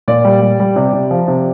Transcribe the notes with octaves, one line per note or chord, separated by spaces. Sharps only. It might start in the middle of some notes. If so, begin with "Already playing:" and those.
A#2 D5
G3
G3
G3
C3 D5
C3
F3
C3